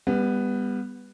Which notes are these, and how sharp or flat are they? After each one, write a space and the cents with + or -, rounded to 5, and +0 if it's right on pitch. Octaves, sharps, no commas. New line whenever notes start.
G3 +35 B3 +0